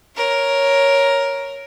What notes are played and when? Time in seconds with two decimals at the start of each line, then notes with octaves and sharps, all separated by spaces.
0.16 A#4 C#5